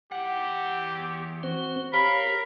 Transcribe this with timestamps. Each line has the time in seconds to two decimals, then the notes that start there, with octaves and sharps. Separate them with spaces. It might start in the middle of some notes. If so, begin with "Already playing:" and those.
0.12 E3 G4 F#5
1.43 C4 F#4 C5
1.94 G4 A#4 C#5 F5 B5